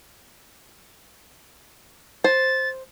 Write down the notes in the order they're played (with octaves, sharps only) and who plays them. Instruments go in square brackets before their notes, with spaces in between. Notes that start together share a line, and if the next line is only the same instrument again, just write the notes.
[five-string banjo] C5 [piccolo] A6